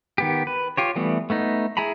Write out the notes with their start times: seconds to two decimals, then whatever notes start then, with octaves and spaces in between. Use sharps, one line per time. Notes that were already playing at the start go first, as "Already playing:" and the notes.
0.18 D#3 B3 G4
0.47 B4
0.77 F4 G4 C#5
0.96 E3 G3 A3 B3
1.30 A3 B3 D#4
1.77 E4 G#4 G#5 A#5 B5